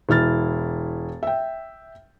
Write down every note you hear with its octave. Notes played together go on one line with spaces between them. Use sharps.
E1 E4 F6 A6
E5 G5